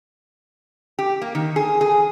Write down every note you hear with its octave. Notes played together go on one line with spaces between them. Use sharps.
G4
A#3
D#3
G#4
G#4